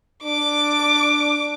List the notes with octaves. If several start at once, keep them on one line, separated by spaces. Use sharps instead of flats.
D4 D6